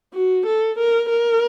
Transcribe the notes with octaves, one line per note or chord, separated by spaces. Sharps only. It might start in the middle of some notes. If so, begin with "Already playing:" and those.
F#4
A4
A#4
A#4